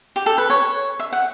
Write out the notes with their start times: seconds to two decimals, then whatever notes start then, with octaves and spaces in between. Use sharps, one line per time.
0.16 G4
0.26 A4
0.38 B4
0.50 C#5
1.00 E5
1.13 F#5